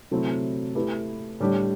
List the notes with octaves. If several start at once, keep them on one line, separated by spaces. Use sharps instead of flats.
C3 F#3 A3 C4 E4
A3 E4 G4 B4
A2 G3 D4 G4